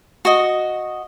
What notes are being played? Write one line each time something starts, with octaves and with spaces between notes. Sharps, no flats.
F#4 D#5